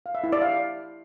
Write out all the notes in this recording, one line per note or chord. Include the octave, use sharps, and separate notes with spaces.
F5
E5
E4
D5
F5